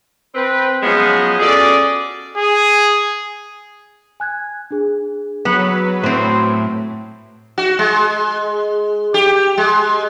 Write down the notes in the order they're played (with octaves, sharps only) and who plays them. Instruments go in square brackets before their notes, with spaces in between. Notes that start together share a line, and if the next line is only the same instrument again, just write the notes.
[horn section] C4 B4
F3 F#3 G#3 B3 C#4 D#5
C#4 F#4 G#4 A4 D5
[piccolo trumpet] G#4
[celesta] G#5 F#6 G#6
D4 G#4
[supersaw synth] F#3 B4 [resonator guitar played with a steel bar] B3
[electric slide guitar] A2 [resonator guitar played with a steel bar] C4 C5
[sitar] F#4
G#3
G4
G#3